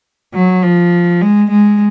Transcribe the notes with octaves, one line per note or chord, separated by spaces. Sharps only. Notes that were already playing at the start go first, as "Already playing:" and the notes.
F#3
F3
G#3
G#3